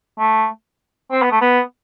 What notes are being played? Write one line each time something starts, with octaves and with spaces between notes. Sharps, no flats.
A3
C4
B3
A3
B3